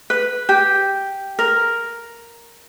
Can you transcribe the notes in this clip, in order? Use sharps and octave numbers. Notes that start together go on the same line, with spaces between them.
B4
G4
A#4